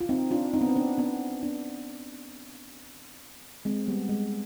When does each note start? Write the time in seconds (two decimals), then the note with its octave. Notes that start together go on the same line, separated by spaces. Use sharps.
0.01 F4
0.09 C4 D#4
0.31 D4 F4
0.54 C4 D#4
0.61 B3
0.69 C4
0.76 B3 D4
0.98 B3 D4
1.43 B3 D4
3.65 G#3 C4
3.87 G3 B3
4.09 G#3